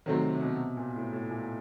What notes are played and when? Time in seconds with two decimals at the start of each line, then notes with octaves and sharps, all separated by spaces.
0.06 C3 D#3 F#3 A3 C4
0.35 C3
0.42 B2
0.77 A#2
0.96 A2
1.13 A2
1.31 A#2